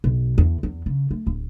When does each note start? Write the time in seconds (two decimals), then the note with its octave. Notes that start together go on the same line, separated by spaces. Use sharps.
0.04 B1
0.38 E2
0.63 E2
0.86 C#3
1.11 A3
1.27 D1